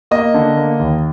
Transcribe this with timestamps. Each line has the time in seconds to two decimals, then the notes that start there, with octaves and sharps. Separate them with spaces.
0.11 A#3 D#5
0.34 D3
0.57 A#3
0.80 D#2